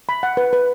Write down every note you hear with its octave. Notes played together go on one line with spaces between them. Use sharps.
B5
F#5
B4
B4